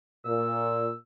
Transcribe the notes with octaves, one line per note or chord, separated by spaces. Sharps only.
A#2 E6